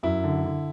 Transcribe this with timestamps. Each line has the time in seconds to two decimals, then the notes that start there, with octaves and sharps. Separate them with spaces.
0.03 F#2 E4
0.24 D3
0.45 D3